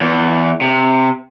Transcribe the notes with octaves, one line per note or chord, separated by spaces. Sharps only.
E2
C3